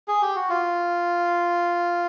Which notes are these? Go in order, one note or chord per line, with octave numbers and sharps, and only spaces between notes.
G#4
G4
F#4
F4